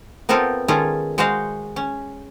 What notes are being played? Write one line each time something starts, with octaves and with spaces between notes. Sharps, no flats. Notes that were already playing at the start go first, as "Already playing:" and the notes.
B3 C4 F4 A4 A#4 C5
D#3 G#3 C#4 F4 G#4 A4
G#3 F#4 C5 D#5 F5
C#4